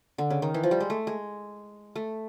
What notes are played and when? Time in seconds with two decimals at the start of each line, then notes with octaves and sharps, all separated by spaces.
0.18 D3
0.30 C#3
0.42 D#3
0.54 E3
0.63 F3
0.71 G3
0.80 G#3
0.90 A3
1.07 G#3
1.96 A3